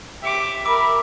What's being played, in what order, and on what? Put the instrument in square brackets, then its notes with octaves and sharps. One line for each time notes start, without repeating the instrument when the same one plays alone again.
[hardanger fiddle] G4 D6 [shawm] E5
[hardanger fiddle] A#4 [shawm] E5 [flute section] B5 [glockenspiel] D6